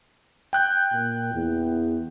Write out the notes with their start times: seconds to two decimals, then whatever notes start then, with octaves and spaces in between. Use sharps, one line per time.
0.53 G5 F#6 G6
0.92 A#2
1.34 E2